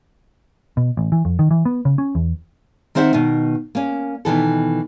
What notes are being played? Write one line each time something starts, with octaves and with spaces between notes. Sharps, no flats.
B2
A1
E3
F2
D#3
E3
B3
C#3
C#4
E2
D#3 C4 C5 E5 F#5
B2 D#3
A#3 C#4
B2 D#3 E3 A4